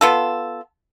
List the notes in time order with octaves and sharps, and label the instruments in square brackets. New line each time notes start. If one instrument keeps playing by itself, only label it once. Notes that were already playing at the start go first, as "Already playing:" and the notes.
[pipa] B3 F4 A4